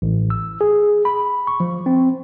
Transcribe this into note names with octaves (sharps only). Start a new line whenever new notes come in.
A1
E6
G#4
B5
C#6
F3
C4